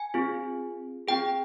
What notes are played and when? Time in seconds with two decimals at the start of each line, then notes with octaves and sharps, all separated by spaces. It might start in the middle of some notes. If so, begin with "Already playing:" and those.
Already playing: G#5
0.14 C4 F4 G#4
1.08 C4 F4 G#4 G5